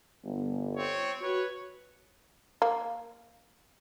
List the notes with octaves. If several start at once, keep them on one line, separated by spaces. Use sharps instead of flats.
G1
C4 C#5
F#4 B4 C#5
A#3